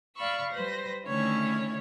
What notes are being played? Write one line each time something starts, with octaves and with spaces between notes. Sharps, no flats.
D5 F5 B5 C#6 E6
G3 B4 C5 A#6
D3 D#3 A3 C#4 E4 C#5